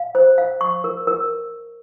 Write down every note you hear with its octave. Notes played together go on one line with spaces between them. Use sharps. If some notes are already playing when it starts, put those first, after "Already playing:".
Already playing: F5
C5
F5
C#6
A#4
A#4